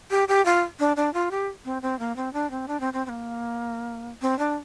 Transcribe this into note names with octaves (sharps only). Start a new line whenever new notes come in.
G4
G4
F4
D4
D4
F4
G4
C4
C4
A#3
C4
D4
C4
D4
C4
C4
C4
A#3
C4
D4